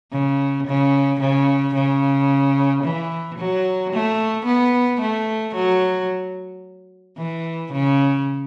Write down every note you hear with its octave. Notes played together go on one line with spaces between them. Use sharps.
C#3
C#3
C#3
C#3
E3
F#3
A3
B3
A3
F#3
E3
C#3